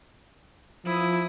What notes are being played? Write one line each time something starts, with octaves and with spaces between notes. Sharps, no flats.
F3 E4 D#6